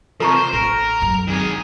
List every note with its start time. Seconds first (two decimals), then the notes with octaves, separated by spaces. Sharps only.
0.20 C3 F3 A4 A#5 C#6
0.36 C5
0.53 A1 A#4
1.02 F#2
1.27 D#3 G#4